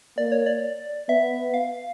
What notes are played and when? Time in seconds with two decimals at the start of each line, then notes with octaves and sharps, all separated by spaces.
0.18 A#3 D5
0.32 C#5
0.46 D5
1.09 B3 E5
1.54 F5